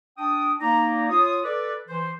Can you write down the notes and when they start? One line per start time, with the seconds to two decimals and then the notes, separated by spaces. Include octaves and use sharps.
0.18 D4 G5 D#6
0.60 A#3 D#4 D5 A#5
1.09 F4 C#5 D#6
1.43 A4 B4 D5
1.88 E3 C5